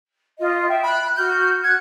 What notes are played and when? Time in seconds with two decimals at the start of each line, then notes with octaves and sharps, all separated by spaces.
0.39 F4 D#5
0.68 E5 G5
0.83 B5 F#6
1.16 F#4 F6 G6
1.64 F#5 F#6 G#6